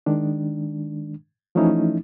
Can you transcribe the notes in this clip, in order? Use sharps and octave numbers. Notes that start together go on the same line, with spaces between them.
D#3 G#3 D4
E3 F3 A3 C#4 D#4 E4